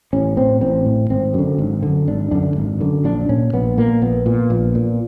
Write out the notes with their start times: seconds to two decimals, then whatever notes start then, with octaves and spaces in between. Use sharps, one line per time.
0.13 A1 C#4
0.37 A2 C4
0.61 A1 C4
0.86 A2
1.10 G#1 C4
1.34 F#2 D3
1.58 G#1
1.83 F#2 D3
2.07 G#1 D4
2.31 F#2 D3 D4
2.56 G#1
2.80 F#2 D3
3.04 A#1 D4
3.29 A#2 C#4
3.53 A#1 B3
3.78 A#2 A#3
4.02 A#1 B3
4.26 A#2
4.50 A#1
4.75 A#2